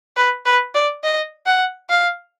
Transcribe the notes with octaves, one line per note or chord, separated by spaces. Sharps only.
B4
B4
D5
D#5
F#5
F5